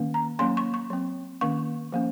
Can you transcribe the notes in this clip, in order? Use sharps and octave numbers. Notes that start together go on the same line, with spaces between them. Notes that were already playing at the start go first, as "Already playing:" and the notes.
Already playing: D#3 A#3 C#4
A#5
F#3 A#3 C#4 C6
C#6
C#6
F#3 C4
D#3 A#3 C#4 C#6
F3 A#3 C#4